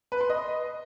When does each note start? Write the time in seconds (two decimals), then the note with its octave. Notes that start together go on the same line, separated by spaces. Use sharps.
0.12 B4
0.21 C6
0.30 D#5